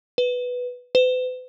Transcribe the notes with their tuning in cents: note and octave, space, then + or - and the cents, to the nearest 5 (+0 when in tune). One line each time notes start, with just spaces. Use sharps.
B4 +0
B4 +45